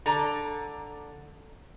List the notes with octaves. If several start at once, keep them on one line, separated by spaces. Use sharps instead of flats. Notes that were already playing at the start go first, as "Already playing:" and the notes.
D3 A4 A#5